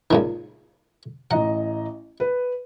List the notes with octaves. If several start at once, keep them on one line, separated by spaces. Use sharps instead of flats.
C#2 A#2 D#3
A1 D#5 F#5 A#5
B4